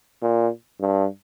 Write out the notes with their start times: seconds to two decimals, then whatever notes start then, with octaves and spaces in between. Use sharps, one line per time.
0.22 A#2
0.80 G2